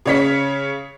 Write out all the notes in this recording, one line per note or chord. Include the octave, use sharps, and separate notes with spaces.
C#3 C#5 B6